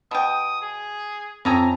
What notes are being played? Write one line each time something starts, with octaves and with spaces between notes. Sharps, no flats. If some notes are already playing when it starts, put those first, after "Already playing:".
B2 G5 D#6
G#4
F2 C#3 A4 G#5 A#5